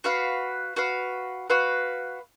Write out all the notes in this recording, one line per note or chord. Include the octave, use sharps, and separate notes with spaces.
F#4 B4 F5
F#4 B4 F5
F#4 B4 F5